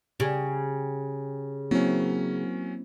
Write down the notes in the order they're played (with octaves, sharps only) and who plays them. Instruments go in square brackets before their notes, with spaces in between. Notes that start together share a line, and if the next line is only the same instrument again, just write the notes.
[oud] C#3 [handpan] G4
[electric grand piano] F#3 C#4 [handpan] A#3 C4 E4